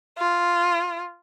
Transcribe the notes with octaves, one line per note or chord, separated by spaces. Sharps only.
F4